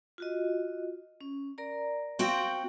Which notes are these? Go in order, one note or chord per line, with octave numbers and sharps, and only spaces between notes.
F4 F#4 D#5
C#4
A#4 D5 A#5
C4 F#4 F5 G5 C6